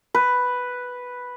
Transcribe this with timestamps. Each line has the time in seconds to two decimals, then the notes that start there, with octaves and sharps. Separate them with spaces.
0.14 B4